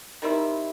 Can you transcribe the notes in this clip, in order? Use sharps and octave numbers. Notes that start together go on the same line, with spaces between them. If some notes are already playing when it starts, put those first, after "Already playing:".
D#3 G3 C4 E4